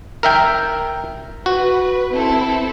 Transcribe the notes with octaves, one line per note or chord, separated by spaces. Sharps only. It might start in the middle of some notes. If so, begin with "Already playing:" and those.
A#4 E5 G5
F#4 B4
C4 E4 A4